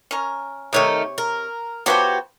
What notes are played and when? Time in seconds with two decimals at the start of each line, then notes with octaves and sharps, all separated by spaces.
0.11 C#4 A#4
0.73 C3 D#3 A3 D#4 C#5
1.18 A#4
1.86 F3 B3 F#4 G4 C5 C#5